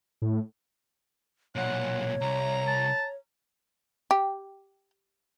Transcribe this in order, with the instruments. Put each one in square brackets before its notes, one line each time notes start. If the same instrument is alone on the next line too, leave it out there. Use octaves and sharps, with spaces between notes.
[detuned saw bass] A2
[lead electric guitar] B1 A#2 [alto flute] C#5 [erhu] F#5
[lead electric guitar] C2 [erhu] A#5
[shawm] A5
[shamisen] G4